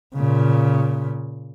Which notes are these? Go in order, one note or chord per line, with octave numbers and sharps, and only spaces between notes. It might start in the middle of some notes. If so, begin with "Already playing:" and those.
A#2 C#3